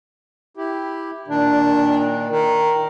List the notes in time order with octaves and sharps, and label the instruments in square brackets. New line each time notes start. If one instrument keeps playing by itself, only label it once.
[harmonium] E4 G4
[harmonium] A#2 D#3 [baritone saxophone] D4
[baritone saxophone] D#3